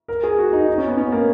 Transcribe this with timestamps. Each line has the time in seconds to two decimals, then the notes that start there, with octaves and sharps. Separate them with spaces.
0.08 A#4
0.23 G#4
0.38 F#4
0.53 D#4
0.67 D#4
0.78 C#4
0.88 B3
0.97 C#4
1.12 A#3